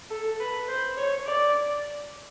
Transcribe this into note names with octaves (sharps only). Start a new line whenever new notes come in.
A4
B4
C5
C#5
D5